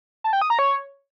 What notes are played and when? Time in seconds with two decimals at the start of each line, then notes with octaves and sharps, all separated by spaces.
0.24 A5
0.33 G5
0.42 D#6
0.50 A#5
0.59 C#5